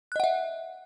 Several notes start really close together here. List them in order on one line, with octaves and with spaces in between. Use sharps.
F#6 D#5 F#5 E5